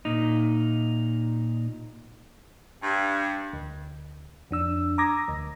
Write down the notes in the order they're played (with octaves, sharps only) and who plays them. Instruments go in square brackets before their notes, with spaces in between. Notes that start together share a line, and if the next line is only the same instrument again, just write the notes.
[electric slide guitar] A#2 D#4
[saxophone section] G2
[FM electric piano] D2
F2 D4 E6
A#5 D6 D#6 G#6 A#6
D2